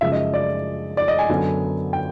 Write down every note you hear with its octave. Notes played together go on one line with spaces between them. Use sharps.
F#2 C#3 F3 G#3 E5
D#5
D5
D5
D#5
G#5
F#2 D3 F#3 B3 D4
G5